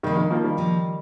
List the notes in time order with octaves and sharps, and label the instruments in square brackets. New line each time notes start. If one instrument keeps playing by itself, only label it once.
[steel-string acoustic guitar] C3 F3 A#3 [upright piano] D#3 G3
[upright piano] D#3 G3
F3 A#3
D#3 G3
[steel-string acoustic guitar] C3 F3 A#3